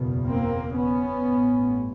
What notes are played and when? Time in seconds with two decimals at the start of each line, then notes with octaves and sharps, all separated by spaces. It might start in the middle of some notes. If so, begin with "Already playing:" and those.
Already playing: F#1 E2 B2
0.26 A#3 C4
0.77 B3 C#4
1.27 A1 G2